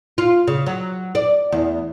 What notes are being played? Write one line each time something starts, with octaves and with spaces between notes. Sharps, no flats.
F4
C#3
F#3
D5
E2